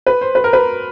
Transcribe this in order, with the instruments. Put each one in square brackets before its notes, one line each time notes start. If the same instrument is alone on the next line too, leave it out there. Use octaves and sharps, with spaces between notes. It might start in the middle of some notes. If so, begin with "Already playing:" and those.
[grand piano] B4
C5
B4
A#4
B4